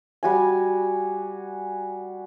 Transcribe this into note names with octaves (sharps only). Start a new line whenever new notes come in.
G3 F#4 G#5